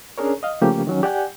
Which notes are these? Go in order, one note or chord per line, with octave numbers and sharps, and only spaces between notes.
C#4 D4 G#4 A#4 C#5
D#5 F5
C#3 F3 A3 A#3 C#4 G4
D#3 F#3 C#4
G4 D5 F#5 G#5 G6